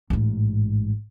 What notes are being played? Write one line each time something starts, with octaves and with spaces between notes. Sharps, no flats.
A1 G#2